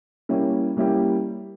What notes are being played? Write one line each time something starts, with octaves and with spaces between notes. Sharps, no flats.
G3 A#3 C#4 E4 G4
G3 A#3 C#4 E4 G4